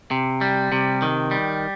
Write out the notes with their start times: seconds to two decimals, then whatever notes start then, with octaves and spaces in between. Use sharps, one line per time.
0.11 C3
0.41 G3
0.72 C3
1.02 D#3
1.31 G3